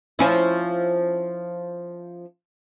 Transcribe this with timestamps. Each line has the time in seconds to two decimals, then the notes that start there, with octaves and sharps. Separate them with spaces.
0.19 F3 C#4 E4